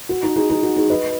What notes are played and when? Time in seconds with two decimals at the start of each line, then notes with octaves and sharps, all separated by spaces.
0.09 F#4
0.23 D#4
0.36 D#4 G#4
0.49 D#4 G#4
0.63 F#4
0.76 D#4 G#4
0.90 B4 D#5